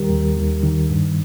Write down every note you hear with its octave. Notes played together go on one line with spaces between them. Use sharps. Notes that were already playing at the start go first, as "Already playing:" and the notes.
Already playing: D#2 D#3 G3 G4 A#4
D#2
D#2
D#3
G2